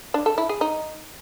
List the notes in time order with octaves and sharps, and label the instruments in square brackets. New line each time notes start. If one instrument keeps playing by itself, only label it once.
[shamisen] D4
A4
E4
G#4
D#4